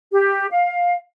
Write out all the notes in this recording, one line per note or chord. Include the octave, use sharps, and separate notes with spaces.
G4
F5